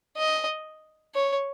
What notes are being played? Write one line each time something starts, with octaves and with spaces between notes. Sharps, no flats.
D#5
C#5